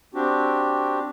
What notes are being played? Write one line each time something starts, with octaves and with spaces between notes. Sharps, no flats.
C4 D4 F#4 G4